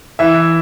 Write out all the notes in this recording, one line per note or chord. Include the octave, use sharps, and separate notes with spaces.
E3 E5